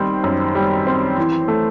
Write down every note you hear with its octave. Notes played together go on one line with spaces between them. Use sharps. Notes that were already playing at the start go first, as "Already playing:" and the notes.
Already playing: D#3 G3 C4
F#2
G3
C4
E3
A3